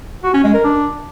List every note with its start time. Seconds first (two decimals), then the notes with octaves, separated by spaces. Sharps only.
0.23 F#4
0.34 C#4
0.44 G#3
0.54 A#4
0.64 D4